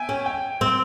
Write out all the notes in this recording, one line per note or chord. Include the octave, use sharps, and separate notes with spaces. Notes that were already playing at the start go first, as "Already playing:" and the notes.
Already playing: E5 G5 G#5
C#4
G5
C4